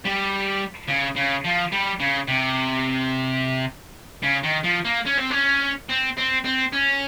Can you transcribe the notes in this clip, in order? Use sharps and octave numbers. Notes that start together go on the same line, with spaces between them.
G3
C#3
C#3
F3
G3
C#3
C3
C#3
D#3
F3
A#3
C#4
C4
C#4
C4
C4
C4
C#4